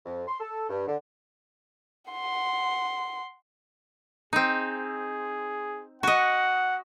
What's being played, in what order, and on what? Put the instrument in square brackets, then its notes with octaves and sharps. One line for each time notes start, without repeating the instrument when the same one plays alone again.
[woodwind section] F2
C6
A4
G2
D3
[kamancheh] F#5 C6
[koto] C4 D#4 [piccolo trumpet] G#4
[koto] F#4 D#5 [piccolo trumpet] F#5